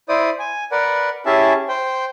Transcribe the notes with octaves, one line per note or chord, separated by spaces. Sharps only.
E4 C5 D5 D#6
G#5
A#4 B4 D5 F#5
C#4 E4 G4 G#4 E5 A5
C5 G5